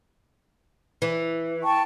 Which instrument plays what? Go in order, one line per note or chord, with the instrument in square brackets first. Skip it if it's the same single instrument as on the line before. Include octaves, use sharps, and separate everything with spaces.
[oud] E3
[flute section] G5 A5 C#6